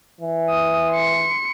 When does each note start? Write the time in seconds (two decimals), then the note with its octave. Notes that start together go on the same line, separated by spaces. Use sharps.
0.21 E3
0.50 D#6
0.91 C6 C#7